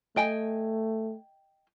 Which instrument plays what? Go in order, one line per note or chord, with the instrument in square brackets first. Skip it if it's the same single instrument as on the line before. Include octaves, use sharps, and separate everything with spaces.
[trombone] A3 [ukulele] D#5 G5 G#5